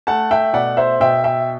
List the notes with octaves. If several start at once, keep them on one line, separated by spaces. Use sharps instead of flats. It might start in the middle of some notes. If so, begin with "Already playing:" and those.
A3 F#5 A5
E5 G5
B2 D5 F#5
C5 E5
B2 E5 G5
E5 G5